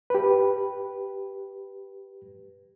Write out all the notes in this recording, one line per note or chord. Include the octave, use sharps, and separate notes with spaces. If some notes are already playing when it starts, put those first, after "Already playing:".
G4 B4